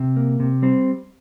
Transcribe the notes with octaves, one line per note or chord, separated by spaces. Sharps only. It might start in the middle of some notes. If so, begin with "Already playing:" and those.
Already playing: C3
A#3
C3
G3 C4